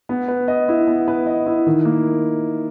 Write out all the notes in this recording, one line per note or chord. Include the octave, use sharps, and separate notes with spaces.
B3
B4
D#5
E4
B3
B4
D#5
E4
D#3
A#3